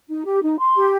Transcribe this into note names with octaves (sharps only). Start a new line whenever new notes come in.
D#4
G4
D#4
C6
G4